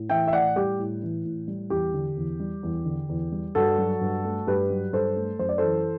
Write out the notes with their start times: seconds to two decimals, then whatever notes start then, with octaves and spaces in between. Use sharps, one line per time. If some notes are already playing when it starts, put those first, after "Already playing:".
Already playing: A2
0.09 E3 E5 G5
0.27 E5
0.33 A2 D5 F#5
0.56 G3 G4
0.79 A2
1.02 E3
1.25 A2
1.48 G3
1.70 E2 G4
1.94 D3
2.16 E2
2.40 G3
2.63 E2
2.85 D3
3.09 E2
3.32 G3
3.55 G2 F#4 A4
3.78 F#3
4.01 G2
4.25 A3
4.47 G2 G4 B4
4.70 F#3
4.93 G2 A4 C5
5.16 A3
5.39 F#2 C5
5.49 D5
5.58 E3 A4 C5